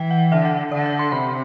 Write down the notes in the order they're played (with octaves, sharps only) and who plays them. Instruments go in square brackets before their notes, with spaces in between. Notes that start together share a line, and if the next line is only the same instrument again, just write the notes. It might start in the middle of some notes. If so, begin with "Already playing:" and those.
Already playing: [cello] E3 [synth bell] G5
[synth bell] F#5
[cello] D3 [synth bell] E5
[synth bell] F#5
[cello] D3 [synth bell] D5
[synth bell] F#5
C6
[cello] C3 [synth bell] B5